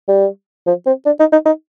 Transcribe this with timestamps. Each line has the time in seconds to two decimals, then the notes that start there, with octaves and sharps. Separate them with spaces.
0.08 G3
0.67 F3
0.86 C4
1.06 D4
1.20 D#4
1.32 D#4
1.46 D#4